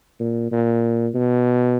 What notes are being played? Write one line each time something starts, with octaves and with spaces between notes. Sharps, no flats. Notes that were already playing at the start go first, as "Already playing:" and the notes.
A#2
A#2
B2